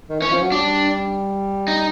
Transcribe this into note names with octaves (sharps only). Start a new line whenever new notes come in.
D#3
E3 C#4
F3
F#3
G3 D4
D#4